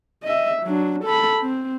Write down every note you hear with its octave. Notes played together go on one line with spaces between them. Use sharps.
D#5 E5
F#3 D4
A4 B5
C4